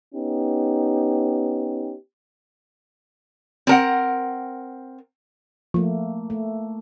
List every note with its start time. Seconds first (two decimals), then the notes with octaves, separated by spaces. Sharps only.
0.14 B3 C#4 D#4 G4
3.67 C4 A#4 F#5
5.74 F3 A3 A#3
6.30 A3